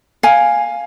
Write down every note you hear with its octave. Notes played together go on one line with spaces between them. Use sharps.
F5 G#5